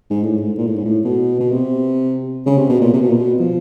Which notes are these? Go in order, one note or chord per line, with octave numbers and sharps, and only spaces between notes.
G#2
A2
G#2
A#2
A2
G#2
A2
B2
B2
C3
C#3
C3
B2
A#2
C3
B2
A#2
B2
F3